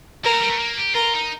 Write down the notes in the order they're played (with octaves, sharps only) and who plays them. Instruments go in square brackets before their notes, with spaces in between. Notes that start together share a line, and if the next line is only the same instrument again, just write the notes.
[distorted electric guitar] A#3 [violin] A#4
[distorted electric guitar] A3
G3
A3
A#3
G4
[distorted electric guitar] F4 [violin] A#4
[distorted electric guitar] D#4